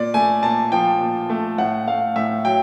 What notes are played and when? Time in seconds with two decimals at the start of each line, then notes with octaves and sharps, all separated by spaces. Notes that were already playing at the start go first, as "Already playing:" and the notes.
Already playing: A#2 D5
0.14 A3 G#5
0.43 A#2 A5
0.72 F3 G5
1.00 A#2
1.30 A3
1.58 A2 F#5
1.87 A3 F5
2.16 A2 E5
2.45 F#3 G5